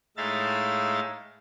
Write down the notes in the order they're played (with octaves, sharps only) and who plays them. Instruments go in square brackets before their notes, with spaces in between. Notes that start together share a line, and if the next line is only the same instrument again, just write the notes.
[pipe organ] A2 G#3 D#4 E5 F5 A6